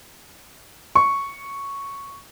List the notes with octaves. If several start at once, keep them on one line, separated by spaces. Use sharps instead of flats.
C#6